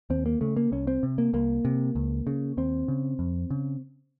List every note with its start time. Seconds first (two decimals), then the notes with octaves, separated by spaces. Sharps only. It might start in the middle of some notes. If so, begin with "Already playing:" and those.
0.10 D#2 C4
0.26 A#3
0.41 C#3 A3
0.57 A#3
0.72 C2 C#4
0.87 C4
1.03 C3
1.18 A#3
1.33 C2 A#3
1.65 C3
1.95 C#2
2.27 C#3
2.57 D#2 C4
2.88 C#3
3.19 F2
3.51 C#3